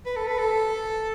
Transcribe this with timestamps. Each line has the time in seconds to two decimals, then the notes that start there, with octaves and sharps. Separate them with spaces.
0.06 B4
0.16 A4
0.27 B4
0.38 A4